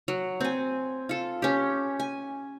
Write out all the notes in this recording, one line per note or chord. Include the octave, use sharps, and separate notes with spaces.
F#3
C4 G#5
F4 A4
C#4 G4
G#5